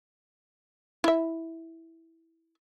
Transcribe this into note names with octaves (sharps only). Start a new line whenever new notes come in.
E4 E5